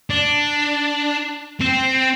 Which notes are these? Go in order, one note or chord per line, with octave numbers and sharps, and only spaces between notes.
D4
C4